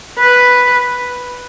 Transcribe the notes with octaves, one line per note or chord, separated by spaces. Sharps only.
B4